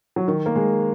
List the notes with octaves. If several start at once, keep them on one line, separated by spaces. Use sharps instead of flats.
F#3
D#3
A#3
G#3